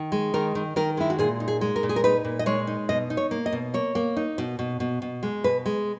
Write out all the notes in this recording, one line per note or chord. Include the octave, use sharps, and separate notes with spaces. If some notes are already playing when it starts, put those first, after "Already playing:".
Already playing: D#3
G#3
D#3 A#4
D#3
D#3 A#4
G#3 E4
F#4
A#2 G#4
D#4
G#4
G#3
A#4
A#2
G#4
A#4
D#4 B4
A#2
D#5
G#3 C#5
D#4
B2 D#5
D#4
C#5
A#3
D#5
B2
A#3 C#5
A#3
D#4
B2
B2
B2
B2
G#3
B2 B4
G#3